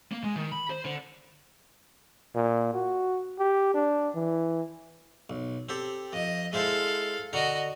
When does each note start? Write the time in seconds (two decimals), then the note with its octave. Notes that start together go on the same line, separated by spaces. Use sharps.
0.12 A#3
0.24 G#3
0.36 D#3
0.52 B5
0.70 C5
0.85 D3
2.35 A#2
2.74 F#4
3.39 G4
3.74 D4
4.15 E3
5.30 B1
5.69 C4 G4 A4
6.13 F2 D#5
6.53 G#3 E4 A4 C5 F5
7.33 D3 F#4 D#5 A#5